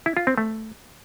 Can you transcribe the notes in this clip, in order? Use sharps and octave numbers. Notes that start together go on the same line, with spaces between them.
E4
F4
C4
A3